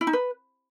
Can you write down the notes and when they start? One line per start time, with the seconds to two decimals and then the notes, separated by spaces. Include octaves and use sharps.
0.01 E4
0.07 D#4
0.13 B4